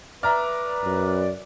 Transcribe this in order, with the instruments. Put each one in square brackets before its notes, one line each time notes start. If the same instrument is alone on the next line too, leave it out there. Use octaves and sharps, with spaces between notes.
[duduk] B4 [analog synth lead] D5 [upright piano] E5 A#5 F6
[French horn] F#2